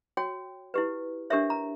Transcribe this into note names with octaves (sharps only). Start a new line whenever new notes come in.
F#4 C#5 G5
E4 G4 B4
D4 G4 A#4 C#5 E5
A#5